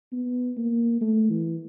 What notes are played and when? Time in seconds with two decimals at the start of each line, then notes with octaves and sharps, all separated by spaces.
0.13 B3
0.57 A#3
1.01 A3
1.30 E3